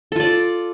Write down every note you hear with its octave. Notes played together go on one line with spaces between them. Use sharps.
F4 A4 D5